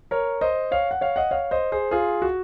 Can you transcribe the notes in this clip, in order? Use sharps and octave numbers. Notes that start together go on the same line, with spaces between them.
A#4 C#5
C5 D#5
C#5 F5
F#5
C#5 F5
D#5 F#5
C#5 F5
C5 D#5
G#4 C5
F4 G#4
F#4